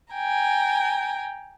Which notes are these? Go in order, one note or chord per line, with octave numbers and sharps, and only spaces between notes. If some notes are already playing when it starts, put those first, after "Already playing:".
G5 G#5 A#5